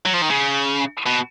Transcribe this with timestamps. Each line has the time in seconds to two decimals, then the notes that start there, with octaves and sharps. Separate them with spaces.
0.06 F#3
0.14 F3
0.22 D#3
0.31 C#3
1.06 B2